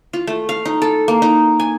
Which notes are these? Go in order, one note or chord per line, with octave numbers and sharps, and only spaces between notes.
F4
A3
F5
D#4
A4
A#3
D#4
G#5